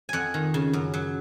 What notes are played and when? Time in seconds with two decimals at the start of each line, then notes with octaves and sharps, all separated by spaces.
0.09 F2 F#5 G#5
0.34 D#3
0.54 C#3
0.73 F#2
0.94 F#3